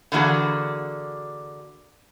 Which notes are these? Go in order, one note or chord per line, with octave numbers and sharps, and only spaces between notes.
D3 E3 A#3 F#4 G#4